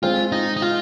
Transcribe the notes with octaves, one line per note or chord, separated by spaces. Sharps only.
G#3 C4 F4
D#4
D#4
F4